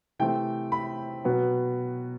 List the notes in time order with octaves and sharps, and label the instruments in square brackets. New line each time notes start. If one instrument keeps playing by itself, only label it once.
[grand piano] C3 E3 A3 C4 G5
B5
B2 F#3 B3